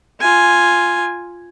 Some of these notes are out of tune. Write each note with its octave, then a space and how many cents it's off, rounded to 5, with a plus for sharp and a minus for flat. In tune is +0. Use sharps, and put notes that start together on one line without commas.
F4 +0 G#5 +0